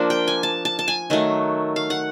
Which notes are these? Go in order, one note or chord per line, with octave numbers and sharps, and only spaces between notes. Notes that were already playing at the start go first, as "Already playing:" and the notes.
Already playing: F3 A#3 D4
G5
G#5
A5
A5
A5
G#5
D#3 F#3 A3
F5
F#5